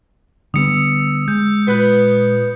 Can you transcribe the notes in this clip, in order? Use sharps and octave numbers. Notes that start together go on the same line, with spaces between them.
D3 G3 B3 D#6 E6 C#7
G#3 G6
A#2 B3 B4